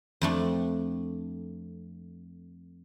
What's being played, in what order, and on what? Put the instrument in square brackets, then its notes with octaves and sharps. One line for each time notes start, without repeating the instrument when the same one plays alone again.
[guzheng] F2 A3 D4